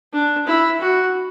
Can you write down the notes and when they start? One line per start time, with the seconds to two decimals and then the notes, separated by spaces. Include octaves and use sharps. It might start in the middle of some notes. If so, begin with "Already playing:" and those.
0.13 D4
0.47 E4
0.80 F#4